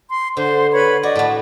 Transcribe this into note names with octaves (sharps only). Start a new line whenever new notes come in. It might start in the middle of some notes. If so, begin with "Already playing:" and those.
C6
D3 C5
B4 C#5 B5
F#4 D5 D#5
A2 A3